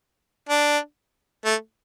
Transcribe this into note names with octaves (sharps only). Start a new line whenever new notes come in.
D4
A3